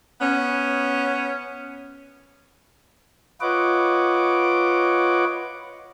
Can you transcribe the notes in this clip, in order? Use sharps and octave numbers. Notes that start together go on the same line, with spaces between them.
B3 C#4
F4 B4 C#5 D#5 F#5 D6